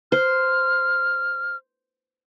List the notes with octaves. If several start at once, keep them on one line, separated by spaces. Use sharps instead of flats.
C5 F6